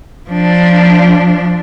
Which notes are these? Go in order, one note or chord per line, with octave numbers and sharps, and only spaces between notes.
F3 D4